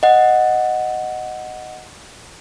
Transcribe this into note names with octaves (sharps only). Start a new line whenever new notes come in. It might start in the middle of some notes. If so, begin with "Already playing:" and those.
D#5 F#5